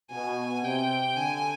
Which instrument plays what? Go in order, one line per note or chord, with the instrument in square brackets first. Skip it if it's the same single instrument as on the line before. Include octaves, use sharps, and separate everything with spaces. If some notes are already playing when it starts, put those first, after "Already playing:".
[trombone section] B2 [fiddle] G#5
[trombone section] C3 [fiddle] G5
[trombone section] D3 [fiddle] G#5